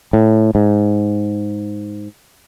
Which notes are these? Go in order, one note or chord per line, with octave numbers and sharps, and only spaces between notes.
A2
G#2